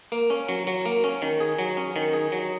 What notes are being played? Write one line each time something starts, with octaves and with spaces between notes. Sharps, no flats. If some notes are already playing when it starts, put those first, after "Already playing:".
A#3
C#4
F#3
F#3
A#3
C#4
D#3
G#4
F#3
C#4
D#3
G#4
F#3